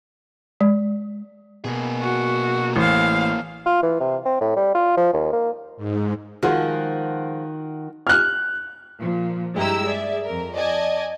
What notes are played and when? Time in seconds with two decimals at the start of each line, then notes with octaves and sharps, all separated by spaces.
0.61 G#3
1.65 B2 A#3 G#4
2.01 F#4
2.76 A1 C5 F5
3.66 F4
3.83 E3
4.00 C3
4.25 C4
4.41 A2
4.56 G3
4.75 F4
4.97 F3
5.13 D#2
5.33 A#3
5.77 G#2
6.43 D#3 F3 G#3 F4 F#4
8.07 F6 F#6
9.00 A#2 F3
9.55 G2 G#3 E4 G4 A#5 E6
9.87 G#4 D5 E5
10.25 F2 A#4
10.54 D5 D#5 G#5 A5